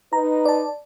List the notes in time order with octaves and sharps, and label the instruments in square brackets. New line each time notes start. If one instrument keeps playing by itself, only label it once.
[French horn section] D#4 B4 [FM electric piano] A#5
[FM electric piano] D5 A5